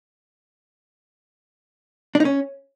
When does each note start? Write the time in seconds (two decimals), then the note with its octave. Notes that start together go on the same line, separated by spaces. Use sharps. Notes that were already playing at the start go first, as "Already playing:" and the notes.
2.15 D4
2.20 D#4
2.25 C#4